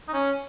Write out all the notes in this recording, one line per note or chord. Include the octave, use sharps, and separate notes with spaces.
D#4
C#4